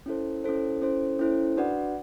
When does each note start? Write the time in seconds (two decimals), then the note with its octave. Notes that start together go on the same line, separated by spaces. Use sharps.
0.06 C#4 E4 A4 C5
0.44 C#4 E4 A4 C5
0.82 C#4 E4 A4 C5
1.19 C#4 E4 A4 C5
1.57 D4 F#4 B4 D5 F#5